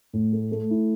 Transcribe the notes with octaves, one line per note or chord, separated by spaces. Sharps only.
A2
A3
A3
E4